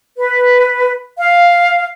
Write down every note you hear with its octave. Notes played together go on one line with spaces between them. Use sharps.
B4
F5